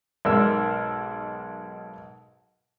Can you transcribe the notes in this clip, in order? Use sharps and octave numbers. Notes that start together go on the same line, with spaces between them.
B1 G#2 A#4 E6